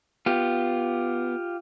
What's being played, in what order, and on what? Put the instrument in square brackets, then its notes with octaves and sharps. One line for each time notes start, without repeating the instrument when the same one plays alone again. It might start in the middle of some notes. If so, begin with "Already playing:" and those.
[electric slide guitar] B3 [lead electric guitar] F4 G4